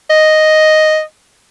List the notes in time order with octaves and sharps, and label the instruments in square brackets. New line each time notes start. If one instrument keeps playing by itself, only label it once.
[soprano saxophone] D#5